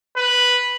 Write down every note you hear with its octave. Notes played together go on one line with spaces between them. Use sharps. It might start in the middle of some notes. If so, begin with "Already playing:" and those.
B4